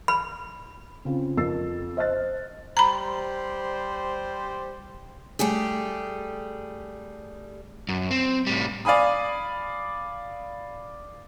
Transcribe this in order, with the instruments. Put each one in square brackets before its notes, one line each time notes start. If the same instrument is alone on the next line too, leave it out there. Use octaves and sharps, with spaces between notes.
[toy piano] B5
[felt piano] C#3 C4 F4
F2 F4 A#4 E6 A6 C7
C5 D#5 F6 F#6 A6
[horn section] G3 C5 [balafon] A#5 B5
[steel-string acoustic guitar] G3 A3 G4 G#4
[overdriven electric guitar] F#2
C4
A2 G3
[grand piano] D5 F5 G#5 B5 D#6